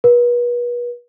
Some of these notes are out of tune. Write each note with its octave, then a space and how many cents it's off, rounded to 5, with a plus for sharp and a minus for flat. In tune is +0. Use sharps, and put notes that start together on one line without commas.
B4 -40